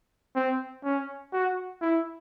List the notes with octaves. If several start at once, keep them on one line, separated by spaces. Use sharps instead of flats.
C4
C#4
F#4
E4